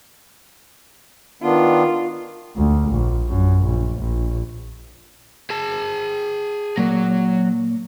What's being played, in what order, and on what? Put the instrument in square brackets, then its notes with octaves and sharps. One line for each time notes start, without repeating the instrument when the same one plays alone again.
[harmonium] D#3 B3 D4 [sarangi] F4
[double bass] D2
A#1
F#2
A#1
A#1
[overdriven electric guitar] G#4 A5
[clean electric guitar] A#2 A#3 [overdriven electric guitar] F#3